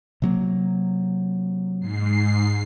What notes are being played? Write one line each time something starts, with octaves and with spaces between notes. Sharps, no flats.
C3 F#3 A#3
G#2 C7